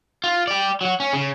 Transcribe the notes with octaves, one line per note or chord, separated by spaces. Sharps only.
F4
G4 D5
F#3 F#4
C#4
C#3